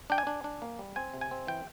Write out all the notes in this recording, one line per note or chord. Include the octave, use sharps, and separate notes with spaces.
D4 G5
G#5
D4
D4
A#3
G3
C4 G#5
C3
G#5
C4
E3 G5